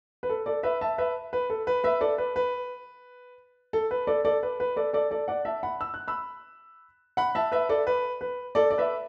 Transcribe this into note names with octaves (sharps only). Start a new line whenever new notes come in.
B4
A4
A4 D5
B4 E5
E5 A5
B4 E5
B4
A4
B4
B4 E5
A4 D5
B4
B4
A4
B4
A4 D5
A4 D5
B4
B4
A4 D5
A4 D5
A4 D5
D5 F#5
E5 A5
F#5 B5
E6
F#6
B5 E6
F#5 B5
E5 A5
B4 E5
A4 D5
B4
B4
A4 D5
D5
B4 E5